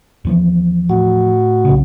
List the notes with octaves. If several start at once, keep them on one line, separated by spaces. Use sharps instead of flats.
D#2 E3 F3
A2 F#4
B1 C#3